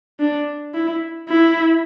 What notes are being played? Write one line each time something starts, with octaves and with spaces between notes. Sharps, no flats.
D4
E4
E4